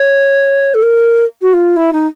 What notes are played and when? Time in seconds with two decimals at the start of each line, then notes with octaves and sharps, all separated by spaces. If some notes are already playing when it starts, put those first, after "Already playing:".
Already playing: C#5
0.74 A4
0.82 A#4
1.41 F#4
1.53 F4
1.76 E4
1.92 D#4